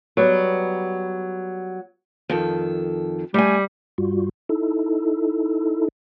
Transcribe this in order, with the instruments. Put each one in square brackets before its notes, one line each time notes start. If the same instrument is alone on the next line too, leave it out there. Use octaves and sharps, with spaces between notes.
[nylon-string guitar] F#3 G3 B3
[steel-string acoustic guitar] F2 D#3 A4
[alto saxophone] G3 [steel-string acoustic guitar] A3 G#5
[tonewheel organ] G2 G3 F4 F#4
D#4 E4 A4